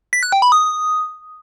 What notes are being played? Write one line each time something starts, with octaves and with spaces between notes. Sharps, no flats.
B6
F#6
G5
B5
D#6